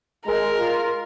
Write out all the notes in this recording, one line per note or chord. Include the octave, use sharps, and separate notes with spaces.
G#3 A#4
F4